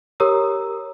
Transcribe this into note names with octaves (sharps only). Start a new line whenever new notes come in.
G4 A#4 C#5 A#5 D#6 E6